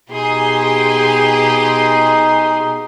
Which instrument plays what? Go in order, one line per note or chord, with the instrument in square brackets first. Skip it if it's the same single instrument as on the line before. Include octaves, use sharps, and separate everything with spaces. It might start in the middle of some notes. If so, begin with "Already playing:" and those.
[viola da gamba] B2 G4 [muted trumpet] D#4 [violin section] G#4 C6